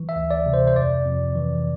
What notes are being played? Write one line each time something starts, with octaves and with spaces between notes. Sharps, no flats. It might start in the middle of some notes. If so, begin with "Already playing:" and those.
Already playing: E3
E5
D2
D5
C3
C5
C5
F2 D5
F2
E3